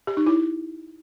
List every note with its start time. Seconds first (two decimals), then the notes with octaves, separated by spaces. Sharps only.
0.07 G4
0.17 D#4
0.26 E4